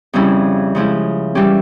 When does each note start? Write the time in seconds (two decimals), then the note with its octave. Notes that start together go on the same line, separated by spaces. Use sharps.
0.13 F2 C#3 G3 C#4 E4
0.75 C#3 F3 G#3 E4
1.35 E3 G3 C#4 G4